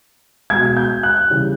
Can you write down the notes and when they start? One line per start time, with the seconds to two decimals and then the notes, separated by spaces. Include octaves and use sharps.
0.50 B2 G#3 G#6
0.77 G6
1.03 F#6
1.30 C#3 E3 G3